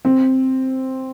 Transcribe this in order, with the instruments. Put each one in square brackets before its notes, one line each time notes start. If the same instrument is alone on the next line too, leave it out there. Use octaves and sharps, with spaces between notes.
[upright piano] C4